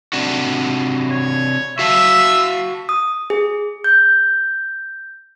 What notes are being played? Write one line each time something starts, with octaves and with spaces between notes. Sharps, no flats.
C3 D4 F#4
C#5
F#4 E5 F5 A5
D#6
G#4
G6